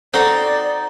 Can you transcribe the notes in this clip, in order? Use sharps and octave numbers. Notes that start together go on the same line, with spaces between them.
C4 D#4 F#4 A4 D5